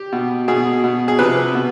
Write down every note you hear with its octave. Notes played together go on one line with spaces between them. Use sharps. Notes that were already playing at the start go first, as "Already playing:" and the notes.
Already playing: G4
B2
B2 G#4
B2
G#4
C3 F3 B4
B2